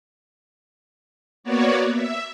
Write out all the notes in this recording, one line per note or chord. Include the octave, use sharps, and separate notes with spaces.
A#3 B3 F#4 C#5 D5
E5